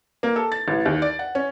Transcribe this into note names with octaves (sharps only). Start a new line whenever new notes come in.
A#3
A4
A6
A1
D#2
D5
F#5
C#4